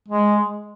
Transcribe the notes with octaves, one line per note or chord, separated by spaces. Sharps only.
G#3